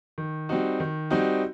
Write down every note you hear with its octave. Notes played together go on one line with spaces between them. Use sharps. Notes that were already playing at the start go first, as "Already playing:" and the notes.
D#3
G3 C4 D#4 F#4
D#3
G3 C4 D#4 F#4